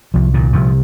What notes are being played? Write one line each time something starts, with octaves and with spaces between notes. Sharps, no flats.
C2 F3
A#2 D#3
C2 F3